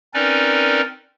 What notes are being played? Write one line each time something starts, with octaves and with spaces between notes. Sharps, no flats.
C4 C#4 D#4 A#4 B4 D5